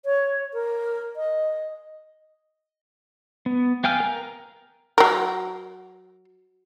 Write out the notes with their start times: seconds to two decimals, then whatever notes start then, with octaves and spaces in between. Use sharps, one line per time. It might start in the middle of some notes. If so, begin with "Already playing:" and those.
0.05 C#5
0.54 A#4
1.16 D#5
3.46 B3
3.84 B3 F5 G5 G#5 F6
4.00 A#4 A#5
4.98 F#3 A#4